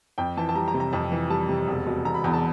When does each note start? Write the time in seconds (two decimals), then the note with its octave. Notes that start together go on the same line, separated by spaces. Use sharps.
0.18 F2 G5
0.37 E3 A5
0.49 A5
0.55 G3 A#5
0.68 A#5
0.74 C3
0.80 A#5
0.93 F2 A5
1.12 E3
1.30 G3 A5
1.49 C3
1.67 E1
1.87 B2
2.05 E1 A#5
2.14 B5
2.24 E2 A#5
2.34 A5